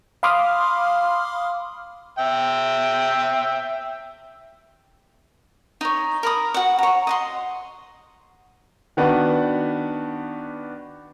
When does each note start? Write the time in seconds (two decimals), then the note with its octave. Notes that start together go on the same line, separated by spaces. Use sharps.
0.23 F5 B5 C6 D6 D#6 F6
2.19 E5 G5
5.81 D#4 C#5
6.23 A#4 B5 D#6
6.54 F#4 F#5
6.79 C#5 A#5
7.07 D#5 F#5 C6
8.97 D#3 B3 D4 F#4 B4